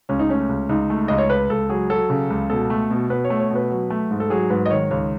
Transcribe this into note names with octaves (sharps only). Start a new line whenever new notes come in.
C#2 C#4
D#4
A3 C#4
C#2
C#2 D#4
A3
C#2 D#5
C#5
C#2 B4
C#2 A4
F#3 G#4
F#3 A4
C#3
C#2
B2 A4
A3
B2
B2 B4
C#5
A3
C#5
B2
B4
F#3
A3
G#2
A4
F#3 G#4
G#2 B4
D#5
D#3 C#5
C#2 C#5